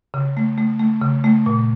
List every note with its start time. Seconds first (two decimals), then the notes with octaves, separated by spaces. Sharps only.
0.14 C#3
0.37 A3
0.58 A3
0.80 A3
1.02 C#3
1.24 A3
1.46 A#2